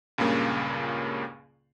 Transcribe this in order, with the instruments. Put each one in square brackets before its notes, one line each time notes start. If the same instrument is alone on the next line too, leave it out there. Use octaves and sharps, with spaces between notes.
[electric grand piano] C#2 G2 A#2 C#3 A#3